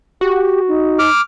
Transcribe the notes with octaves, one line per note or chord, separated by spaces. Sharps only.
F#4 G4
D#4
D6 F6